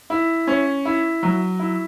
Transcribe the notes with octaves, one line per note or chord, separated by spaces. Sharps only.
E4
C#4
E4
F#3
E4